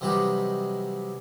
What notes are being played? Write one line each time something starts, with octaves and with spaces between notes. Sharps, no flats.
C3 E3 F#3 G3 D#4 G4